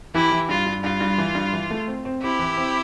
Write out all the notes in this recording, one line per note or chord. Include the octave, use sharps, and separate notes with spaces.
E3 E4 G4
E3
G2 F4
G2
G2 F4
G2
E3
G2
E3
A3
C4
C4
C4 E4 G4
E3
C4